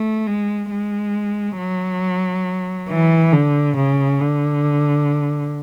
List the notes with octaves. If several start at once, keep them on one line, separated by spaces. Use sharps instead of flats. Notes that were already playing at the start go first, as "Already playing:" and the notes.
Already playing: A3
G#3
G#3
F#3
E3
D3
C#3
D3